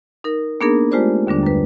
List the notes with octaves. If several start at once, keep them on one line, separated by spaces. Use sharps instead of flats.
D#4 A#4
A#3 B3 D4 D#4 G#4 A#4
G#3 A3 F4 G4 C5 D5
D#2 D3 G3 D4
F#2 B4